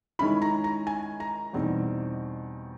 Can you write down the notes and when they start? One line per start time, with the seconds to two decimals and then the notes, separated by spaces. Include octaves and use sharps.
0.19 D#3 G#3 C#4 E4 B5
0.42 A#5
0.64 A#5
0.87 G#5
1.20 A#5
1.53 E2 B2 G3 C4 D#4